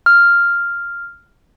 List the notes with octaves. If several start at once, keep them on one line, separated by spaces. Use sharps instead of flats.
F6